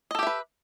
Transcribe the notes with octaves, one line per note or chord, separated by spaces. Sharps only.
G4 A4 B4 D#5 E5